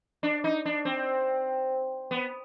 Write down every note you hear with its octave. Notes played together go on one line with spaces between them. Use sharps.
D4
D#4
D4
C4
B3